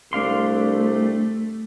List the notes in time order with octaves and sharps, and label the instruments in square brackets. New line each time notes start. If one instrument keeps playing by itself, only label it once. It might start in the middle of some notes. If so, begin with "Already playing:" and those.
[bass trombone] C2 [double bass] A3 [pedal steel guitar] D4 F5 C6